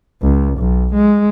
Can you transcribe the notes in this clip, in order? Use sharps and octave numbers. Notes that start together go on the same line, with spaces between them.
C#2
B1
G#3